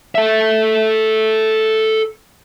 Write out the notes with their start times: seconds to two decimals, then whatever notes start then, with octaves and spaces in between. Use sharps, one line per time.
0.15 A4 E5